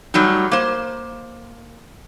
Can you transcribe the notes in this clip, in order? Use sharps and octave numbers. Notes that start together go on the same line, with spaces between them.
F#3 G3 A3 D#4
A#3 C5